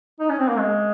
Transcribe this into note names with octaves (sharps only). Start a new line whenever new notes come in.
D#4
C#4
C4
A#3
G#3